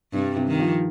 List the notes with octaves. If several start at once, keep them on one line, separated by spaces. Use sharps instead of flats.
G2 C3 G3
C3
D#3
F3